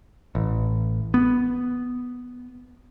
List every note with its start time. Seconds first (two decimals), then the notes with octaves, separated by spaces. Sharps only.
0.35 A1
1.14 B3